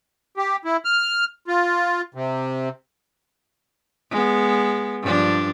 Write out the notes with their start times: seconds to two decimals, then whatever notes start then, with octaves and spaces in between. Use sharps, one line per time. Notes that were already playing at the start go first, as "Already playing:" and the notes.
0.37 G4
0.65 E4
0.85 F6
1.48 F4
2.14 C3
4.11 G#3 B3
5.02 G2 F3 D4